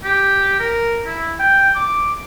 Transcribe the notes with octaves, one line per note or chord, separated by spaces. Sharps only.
G4
A#4
E4
G5
D6